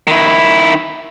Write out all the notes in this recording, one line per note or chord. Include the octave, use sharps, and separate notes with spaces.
D#3 E4